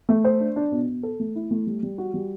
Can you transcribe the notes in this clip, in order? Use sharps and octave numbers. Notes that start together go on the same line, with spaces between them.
A3
C5
D4
D4
B2
B2
A4
A3
E4
A3
G3
G3
F#4
G3